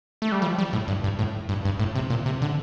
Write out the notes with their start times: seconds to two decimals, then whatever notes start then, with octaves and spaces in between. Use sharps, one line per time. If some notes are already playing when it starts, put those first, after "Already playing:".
0.22 A3
0.32 G3
0.42 F3
0.58 G3
0.73 A2
0.88 G2
1.04 G2
1.19 A2
1.49 G2
1.65 G2
1.79 A2
1.95 C3
2.10 A#2
2.26 C3
2.42 D3